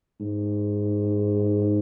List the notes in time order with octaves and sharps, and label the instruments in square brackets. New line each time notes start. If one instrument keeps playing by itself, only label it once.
[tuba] G#2